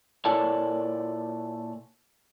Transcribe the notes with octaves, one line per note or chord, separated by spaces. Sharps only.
A#2 E4 A4 C#5 D5 A5